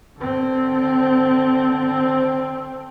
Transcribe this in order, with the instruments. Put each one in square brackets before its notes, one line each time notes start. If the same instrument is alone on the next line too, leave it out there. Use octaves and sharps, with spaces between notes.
[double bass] D3 C4